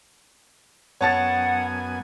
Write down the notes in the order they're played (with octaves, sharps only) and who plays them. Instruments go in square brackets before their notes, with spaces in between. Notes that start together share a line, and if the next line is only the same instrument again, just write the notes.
[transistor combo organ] F#2 B3 G#5 [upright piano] C#5 A5 A6 [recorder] F#5